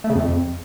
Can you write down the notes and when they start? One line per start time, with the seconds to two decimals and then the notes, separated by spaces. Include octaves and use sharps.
0.04 A3
0.10 C#3
0.15 F2